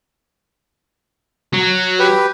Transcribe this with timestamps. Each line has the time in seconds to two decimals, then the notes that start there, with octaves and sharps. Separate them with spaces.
1.54 F#3
1.99 G4 B4